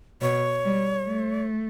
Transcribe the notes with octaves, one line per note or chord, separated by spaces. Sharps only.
B2 C#5
G3
A3